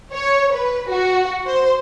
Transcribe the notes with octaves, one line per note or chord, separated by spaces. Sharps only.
C#5
B4
F#4
C5